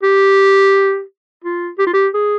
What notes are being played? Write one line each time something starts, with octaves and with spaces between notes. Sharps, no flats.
G4
F4
G4
F4
G4
G#4